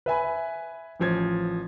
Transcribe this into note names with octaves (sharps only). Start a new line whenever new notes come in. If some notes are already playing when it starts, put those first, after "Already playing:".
B4 E5 G#5 B5
A1 F3 G#6